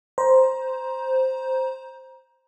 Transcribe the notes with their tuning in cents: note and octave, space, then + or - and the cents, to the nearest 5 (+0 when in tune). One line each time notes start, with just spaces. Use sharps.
C5 +0 A#5 +25